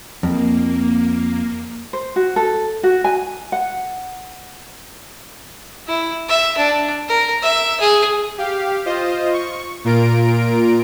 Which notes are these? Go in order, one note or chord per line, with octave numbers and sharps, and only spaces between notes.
F2 A#3
C5
F#4
A4
F#4
G#5
F#5
E4
E5
D4
A#4
E5
G#4
G4 F5
F4 C5 D#5
C#6
A#2 F4 A#4 D7